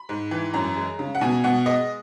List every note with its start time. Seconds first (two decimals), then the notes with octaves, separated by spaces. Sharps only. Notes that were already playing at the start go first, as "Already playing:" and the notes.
Already playing: B5
0.09 G#2
0.31 E3
0.54 F#2 A#5
0.76 G#3
0.99 C#3
1.15 F#5
1.21 B2 G#5
1.44 B2 F#5
1.66 G#3 D#5